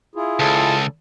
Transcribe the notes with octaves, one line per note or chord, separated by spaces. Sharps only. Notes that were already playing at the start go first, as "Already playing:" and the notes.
E4 F4 G#4
C#2 A4